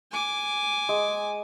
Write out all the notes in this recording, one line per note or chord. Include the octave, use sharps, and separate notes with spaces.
G#5 D6
G#3